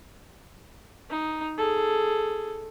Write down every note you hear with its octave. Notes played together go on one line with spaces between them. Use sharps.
D#4
G#4 A4